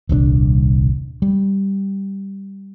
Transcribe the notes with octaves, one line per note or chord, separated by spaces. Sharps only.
D#1 C2 C4 D4
G3